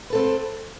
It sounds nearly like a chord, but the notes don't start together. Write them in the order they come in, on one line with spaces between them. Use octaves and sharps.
B4 A4 C4